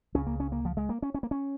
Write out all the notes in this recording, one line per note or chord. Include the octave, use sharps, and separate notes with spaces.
C#2 C#3 C#4
A#3
C#4
A#3
F3
G#3
A#3
C#4
C#4
A#3
C#4